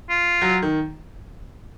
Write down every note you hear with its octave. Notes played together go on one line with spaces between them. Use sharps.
F4
F#3
D#3